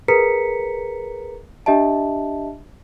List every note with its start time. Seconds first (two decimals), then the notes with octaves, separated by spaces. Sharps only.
0.08 G#4 A#4 B4 A#5 B6 C#7
1.66 D4 G4 D#5 E5 A5